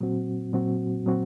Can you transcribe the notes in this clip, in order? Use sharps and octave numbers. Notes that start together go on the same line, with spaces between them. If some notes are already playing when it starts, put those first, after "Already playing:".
A#2 F#3 C4 F#4
A#2 F#3 C4 F#4
A#2 F#3 C4 F#4